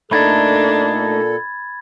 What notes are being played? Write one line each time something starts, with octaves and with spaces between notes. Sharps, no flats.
A#2 A3 D4 D#4 A4 B5 G#6 A6